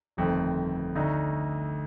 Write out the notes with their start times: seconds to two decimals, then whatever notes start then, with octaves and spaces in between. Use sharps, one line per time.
0.17 G1 F2 D#3 A3 C4
0.95 D2 D3 A3 D#4